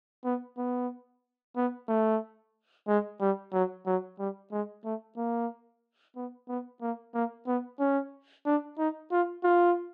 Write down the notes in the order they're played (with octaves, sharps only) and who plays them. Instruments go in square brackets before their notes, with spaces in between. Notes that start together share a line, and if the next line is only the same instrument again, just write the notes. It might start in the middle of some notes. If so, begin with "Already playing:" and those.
[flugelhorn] B3
B3
B3
A3
G#3
G3
F#3
F#3
G3
G#3
A3
A#3
B3
B3
A#3
A#3
B3
C#4
D4
D#4
F4
F4